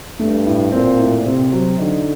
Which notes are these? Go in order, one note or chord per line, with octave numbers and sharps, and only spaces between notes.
G2 A3
A2
A#2 C4
A2
C3 C4
F#3
D3 D#4